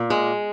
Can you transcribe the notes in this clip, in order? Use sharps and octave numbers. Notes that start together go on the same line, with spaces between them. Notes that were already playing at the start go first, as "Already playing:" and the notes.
Already playing: A#2
G#3